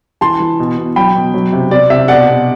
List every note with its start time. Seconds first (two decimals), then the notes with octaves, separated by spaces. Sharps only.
0.21 E3 A5 C6
0.40 E3
0.59 B2
0.78 B2
0.96 F#3 G5 B5
1.15 B2
1.34 F#3
1.53 C3
1.71 C3 D5
1.90 C3 E5
2.08 B2 D5 F#5
2.28 B2